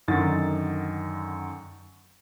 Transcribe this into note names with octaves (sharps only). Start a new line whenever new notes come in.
F#2 D3 D#3 A6